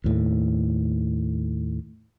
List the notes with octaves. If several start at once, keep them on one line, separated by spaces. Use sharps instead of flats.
D#2 A2